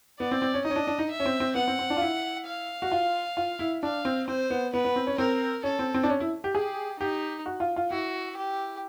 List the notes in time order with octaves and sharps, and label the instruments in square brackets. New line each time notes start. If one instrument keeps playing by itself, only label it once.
[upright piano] B3 [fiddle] D5
[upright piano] C4
C4
C#4
[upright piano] D#4 [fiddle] D#5
[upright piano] C#4
D4
D4
D#4
[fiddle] E5
[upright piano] C#4
C4
C4
[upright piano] B3 [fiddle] F#5
[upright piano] C4
C4
D4
F4
E4
[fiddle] F5
[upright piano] F#4
F4
F4
E4
[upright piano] D4 [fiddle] F5
[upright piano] C4
[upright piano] C4 [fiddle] C5
[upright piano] B3
[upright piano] B3 [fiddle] B4
[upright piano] B3
C4
C#4
[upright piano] C4 [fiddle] A#4
[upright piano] C#4 [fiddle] A4
[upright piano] C4
C4
D4
C#4
E4
G4
[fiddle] G4 [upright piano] G#4
[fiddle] D#4 [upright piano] G4
[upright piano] F#4
F4
F4
[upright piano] E4 [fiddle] F#4
[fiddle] G4